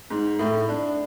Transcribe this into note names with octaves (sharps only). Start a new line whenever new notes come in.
G#2
A2
D4